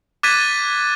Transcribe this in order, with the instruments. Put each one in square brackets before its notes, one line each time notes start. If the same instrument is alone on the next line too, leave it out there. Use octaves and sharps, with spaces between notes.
[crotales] D6 F#6 G#6 A6 B6 D#7